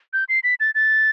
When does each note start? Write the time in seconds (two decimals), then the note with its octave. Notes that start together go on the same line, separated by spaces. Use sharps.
0.13 G6
0.29 C7
0.44 B6
0.60 A6
0.75 A6